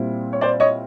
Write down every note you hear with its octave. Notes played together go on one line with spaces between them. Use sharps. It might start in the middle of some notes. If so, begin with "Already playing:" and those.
Already playing: A#2 G3 C4 E4
C#5
C5 D5
C#5 D#5